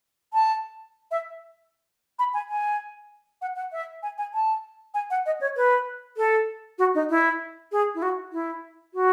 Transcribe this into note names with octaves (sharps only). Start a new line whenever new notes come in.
A5
E5
B5
G#5
G#5
F#5
F#5
E5
G#5
G#5
A5
G#5
F#5
D#5
C#5
B4
A4
F#4
D#4
E4
G#4
E4
F#4
E4
F#4